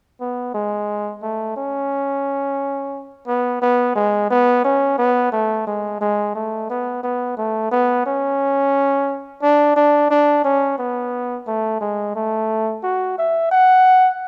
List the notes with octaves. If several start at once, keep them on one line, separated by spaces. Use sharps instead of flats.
B3
G#3
A3
C#4
B3
B3
G#3
B3
C#4
B3
A3
G#3
G#3
A3
B3
B3
A3
B3
C#4
D4
D4
D4
C#4
B3
A3
G#3
A3
F#4
E5
F#5